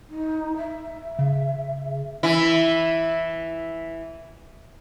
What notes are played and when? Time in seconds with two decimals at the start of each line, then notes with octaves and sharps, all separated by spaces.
0.10 D#4
0.57 E5
1.19 C#3
2.23 E3 E4